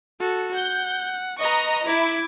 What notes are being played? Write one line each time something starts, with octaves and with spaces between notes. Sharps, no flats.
F#4 A4
F#5 G6
B4 D#5 A#5 C#6
E4 D6 G#6